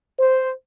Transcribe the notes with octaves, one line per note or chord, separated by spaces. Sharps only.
C5